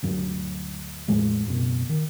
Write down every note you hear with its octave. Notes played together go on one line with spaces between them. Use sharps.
D2 G2 F#3
E2 A2 F3 G#3
F#1 B2
D#3